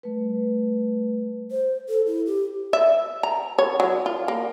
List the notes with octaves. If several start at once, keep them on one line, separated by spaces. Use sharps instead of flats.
G3 A3 B4
C5
A4
E4
G4
E5
A#5
C#5
F#3
F4
A#3